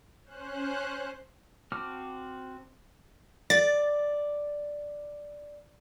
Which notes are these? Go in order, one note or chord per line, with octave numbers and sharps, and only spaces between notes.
C#4 C5 F#6
C4 F#4 A5 D6 F6
D5 A6